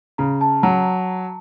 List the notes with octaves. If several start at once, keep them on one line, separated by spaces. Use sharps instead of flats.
C#3 A#5
A5
F#3 A#5